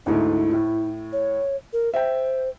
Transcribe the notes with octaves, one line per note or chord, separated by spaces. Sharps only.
D2 G#2 A3 E4
A2
C#5
A#4
C5 E5 G5